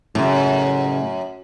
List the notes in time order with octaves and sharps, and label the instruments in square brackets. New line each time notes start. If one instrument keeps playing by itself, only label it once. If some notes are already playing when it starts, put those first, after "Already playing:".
[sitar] F#2 [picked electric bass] A2 C#3